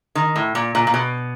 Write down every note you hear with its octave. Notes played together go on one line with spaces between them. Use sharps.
D#3
A2
A#2
A#2
A#2
B2